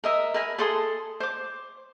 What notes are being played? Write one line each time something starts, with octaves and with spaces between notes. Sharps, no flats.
A#4 D#5 E5
A#4 G#5 B5
G#4 A4 C6 D#6
C5 D6